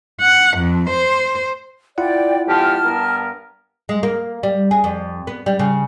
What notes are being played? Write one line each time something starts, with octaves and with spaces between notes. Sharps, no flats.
F#5
F2
C5
E4 F4 D5 F#5 G5
F2 G#2 G4 A5 F6
G2 B3 A#4
G#3
A#3
G3
G#4
F2
B3
G3
C#3